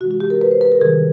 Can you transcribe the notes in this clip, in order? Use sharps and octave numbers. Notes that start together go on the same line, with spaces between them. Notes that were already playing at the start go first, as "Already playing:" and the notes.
C3 E3 G#3 F#4
F#4
G4
A#4
B4
C5
B4
A#4
C3 D#3 G3 G#4